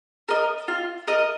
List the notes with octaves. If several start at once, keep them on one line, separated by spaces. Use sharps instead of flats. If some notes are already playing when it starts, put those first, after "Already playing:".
A#4 D#5
F4
A#4 D#5